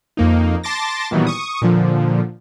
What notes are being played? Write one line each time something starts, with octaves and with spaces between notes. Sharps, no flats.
F2 A#3 D#4
A5 C6 D6 A6 A#6
A#2 D#3 E3 F#3 G3 B3
C#6 D#6
A#2 D3 F3